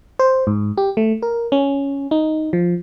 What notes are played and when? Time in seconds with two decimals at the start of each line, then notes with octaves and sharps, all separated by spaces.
0.19 C5
0.47 G#2
0.78 G4
0.97 A3
1.22 A#4
1.52 C#4
2.11 D#4
2.53 F3